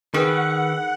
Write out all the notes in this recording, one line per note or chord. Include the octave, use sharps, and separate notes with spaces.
D#3 D#4 G#4 A#4 B4 E5 F#5 G5